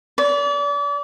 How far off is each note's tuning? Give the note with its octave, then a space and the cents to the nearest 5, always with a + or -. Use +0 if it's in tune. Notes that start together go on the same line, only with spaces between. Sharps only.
D5 -35